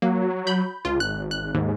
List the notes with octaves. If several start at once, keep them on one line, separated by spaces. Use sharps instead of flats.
F#3 A#3
B5 G6
C#2 F4
G#1 F#6
F#6
D#2 G#2